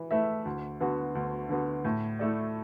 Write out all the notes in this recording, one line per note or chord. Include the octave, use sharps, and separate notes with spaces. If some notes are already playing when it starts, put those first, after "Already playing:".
Already playing: E3
A3 E4 B4 E5
D2
D3 B3 F#4
D2
D3 B3 F#4
A2
A3 E4 A4 D5